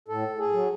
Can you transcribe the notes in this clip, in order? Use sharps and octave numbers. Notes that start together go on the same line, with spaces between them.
A2 A4
G#4
F#3